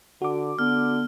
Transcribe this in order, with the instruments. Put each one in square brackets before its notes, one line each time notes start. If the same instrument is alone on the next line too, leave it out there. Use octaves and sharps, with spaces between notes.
[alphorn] D3 [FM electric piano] F#4 D6
[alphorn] D3 [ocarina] B3 [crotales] F6